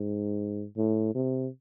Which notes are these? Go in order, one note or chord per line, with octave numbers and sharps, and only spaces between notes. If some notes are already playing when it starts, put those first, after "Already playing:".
Already playing: G#2
A2
C3